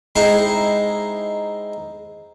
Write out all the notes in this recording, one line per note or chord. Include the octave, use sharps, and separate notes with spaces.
G#3 C4 D#4 E4 C5